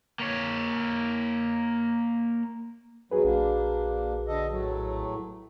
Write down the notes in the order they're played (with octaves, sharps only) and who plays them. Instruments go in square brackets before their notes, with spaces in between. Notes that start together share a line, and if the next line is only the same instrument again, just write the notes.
[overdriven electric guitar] A#3 C#5
[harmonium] E2 B2 F#3 [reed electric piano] F#4 G#4 B4
[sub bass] A#1 [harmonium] A#3 D4
[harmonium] D3 A4 D#5
A2 F#3 A3